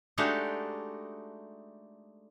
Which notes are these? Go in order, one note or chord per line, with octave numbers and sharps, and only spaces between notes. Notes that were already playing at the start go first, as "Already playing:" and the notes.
G#3 A3 D4 D#4 F#4 G4